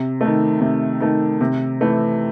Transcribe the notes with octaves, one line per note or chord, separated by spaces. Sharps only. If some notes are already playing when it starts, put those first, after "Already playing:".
Already playing: C3
D#3 A3
C3
D#3 A3
C3
E3 A3